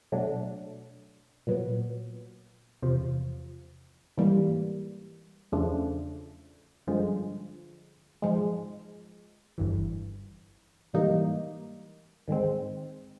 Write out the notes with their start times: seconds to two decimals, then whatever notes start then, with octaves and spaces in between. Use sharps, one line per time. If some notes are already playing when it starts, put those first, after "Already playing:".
0.12 B2 F#3 A3 D4
1.47 A#2 F#3 B3
2.82 E2 C3 F3
4.17 G#2 E3 G3 A#3
5.52 E2 C#3 F3 A3 D4
6.87 G2 D3 F3 G#3
8.22 G#2 F3 G#3
9.58 G1 G2 E3
10.93 G#2 E3 G3 A#3 D#4
12.28 G#2 D#3 G#3 C4